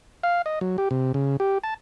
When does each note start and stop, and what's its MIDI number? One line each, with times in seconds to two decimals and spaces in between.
0.23 0.42 77
0.46 0.59 75
0.61 0.77 54
0.78 0.89 67
0.91 1.12 48
1.14 1.37 49
1.40 1.58 67
1.64 1.74 81